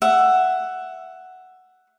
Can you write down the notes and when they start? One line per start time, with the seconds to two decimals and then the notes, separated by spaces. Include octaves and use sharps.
0.02 E5 F#5